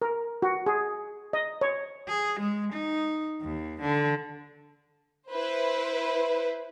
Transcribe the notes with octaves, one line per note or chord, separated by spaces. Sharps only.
A#4
F#4
G#4
D#5
C#5
G#4
G#3
D#4
D#2
D3
E4 B4 C5